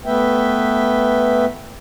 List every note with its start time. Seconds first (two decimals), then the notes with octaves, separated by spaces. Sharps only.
0.05 A3 B3 B4 E5 G5